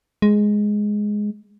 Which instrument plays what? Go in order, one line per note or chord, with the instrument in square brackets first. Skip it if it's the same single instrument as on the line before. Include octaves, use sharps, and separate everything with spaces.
[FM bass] G#3